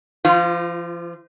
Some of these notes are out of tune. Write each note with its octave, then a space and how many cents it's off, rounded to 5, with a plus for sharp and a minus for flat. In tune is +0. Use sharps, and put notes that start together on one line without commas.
F3 -35 F4 +0